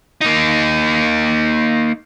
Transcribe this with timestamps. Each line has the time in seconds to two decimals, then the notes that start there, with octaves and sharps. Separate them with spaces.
0.21 A#3 D#4